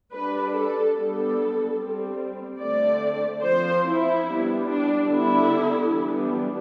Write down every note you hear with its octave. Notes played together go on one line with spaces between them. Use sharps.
G3 D4 B4
A4
G3 B3 D4 A4
G3 C4
D3 A3 C4 D5
F3 C4 C5
E4
G3 B3 D4
D4
D3 G3 B3 D4 E4
E3 G3 B3 D4